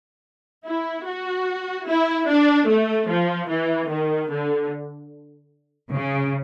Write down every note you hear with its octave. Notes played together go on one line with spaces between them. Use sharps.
E4
F#4
E4
D4
A3
F3
E3
D#3
D3
C#3